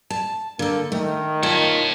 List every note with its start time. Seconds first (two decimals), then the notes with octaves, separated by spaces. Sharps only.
0.10 A5
0.59 D3 A#3 A4
0.92 D#3 A3
1.43 F4 C#5 A5